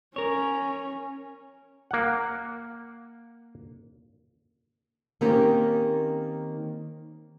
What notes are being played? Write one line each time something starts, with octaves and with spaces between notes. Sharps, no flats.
C#4 A#4 C#5
A#3 F#5
D#3 A#3 C4 C#4 G4 A#4